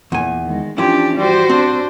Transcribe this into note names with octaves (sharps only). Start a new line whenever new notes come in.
E2 A#2 G#5
D#3 G#3
E3 F3 C#4 D4 E4 G4
G3 F#4 C5
C4 D4